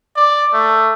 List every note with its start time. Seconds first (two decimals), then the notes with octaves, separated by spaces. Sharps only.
0.16 D5
0.53 A3